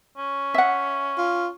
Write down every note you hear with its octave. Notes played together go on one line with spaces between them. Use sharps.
C#4
E5 F#5
F4